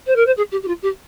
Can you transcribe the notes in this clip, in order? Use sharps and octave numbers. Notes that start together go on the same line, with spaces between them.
C5
A#4
C5
G#4
G4
G4
F4
G4